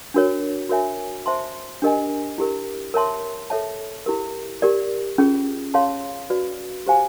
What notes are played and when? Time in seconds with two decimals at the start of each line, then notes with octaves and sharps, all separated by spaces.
0.14 D4 F#4 A#4 C#5
0.69 F#4 A#4 C#5 E5 G#5
1.26 C5 E5 A5 C6
1.82 D4 G4 A#4 D#5 G#5
2.38 E4 G4 A#4
2.94 A#4 C#5 E5 A5 C6
3.50 A4 C#5 E5 A5
4.06 E4 G4 A#4
4.62 G4 A#4 D5
5.18 C#4 F4 G#4
5.74 G#4 C#5 F5 A5 C6
6.30 F#4 B4 D5
6.87 G4 C5 F5 G#5